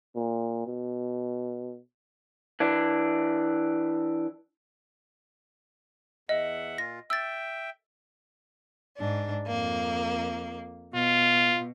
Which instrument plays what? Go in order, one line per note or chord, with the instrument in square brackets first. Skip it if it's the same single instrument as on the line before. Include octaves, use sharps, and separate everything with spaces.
[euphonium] A#2
B2
[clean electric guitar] E3 D4
[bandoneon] E2 E5 F#5 [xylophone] D#5
[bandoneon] A#2 F4 [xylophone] A#6
[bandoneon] E5 G5 [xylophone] E6 A6
[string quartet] G#2 D4
F2 A#3
[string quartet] B2 [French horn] F4